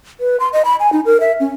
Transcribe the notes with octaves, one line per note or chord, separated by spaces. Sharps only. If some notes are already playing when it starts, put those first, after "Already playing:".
B4
C6
D#5
B5
G#5
D#4
A#4
E5
C#4